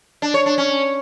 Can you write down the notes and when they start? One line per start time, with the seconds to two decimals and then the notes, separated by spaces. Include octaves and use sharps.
0.22 D4
0.34 C#5
0.46 D4
0.58 C#4